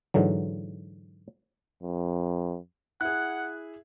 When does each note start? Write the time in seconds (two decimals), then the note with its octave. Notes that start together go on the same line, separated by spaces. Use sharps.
0.14 G#2 D3 E3 F#3
1.83 F2
3.01 E4 G#4 F#5 F#6